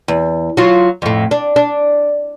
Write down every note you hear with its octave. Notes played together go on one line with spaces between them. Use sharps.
E2
F#3 F4
F2 A2
D4
D4